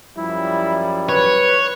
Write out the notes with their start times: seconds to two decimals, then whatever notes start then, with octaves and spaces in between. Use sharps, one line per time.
0.17 F#2 F3 G3 E4
1.09 B4 C#5